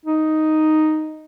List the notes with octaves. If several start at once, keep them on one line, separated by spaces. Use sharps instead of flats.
D#4